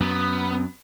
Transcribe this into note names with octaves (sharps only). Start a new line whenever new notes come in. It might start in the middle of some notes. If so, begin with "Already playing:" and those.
F#2 B3